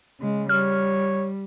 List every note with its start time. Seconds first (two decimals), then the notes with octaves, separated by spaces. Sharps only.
0.20 C#3 G#3
0.49 G3 C#5 F6